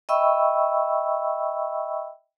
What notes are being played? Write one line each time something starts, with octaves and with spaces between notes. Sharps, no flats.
D#5 E5 G5 B5 C#6 E6